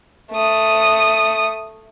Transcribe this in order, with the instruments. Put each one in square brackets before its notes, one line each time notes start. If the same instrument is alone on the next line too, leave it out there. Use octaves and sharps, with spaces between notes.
[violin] A3 D#6